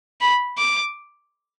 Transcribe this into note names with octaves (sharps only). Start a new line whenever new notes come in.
B5
D6